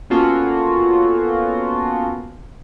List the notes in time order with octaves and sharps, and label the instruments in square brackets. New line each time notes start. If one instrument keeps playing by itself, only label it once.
[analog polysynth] A#3 B3 C#4 F4 F#4 A4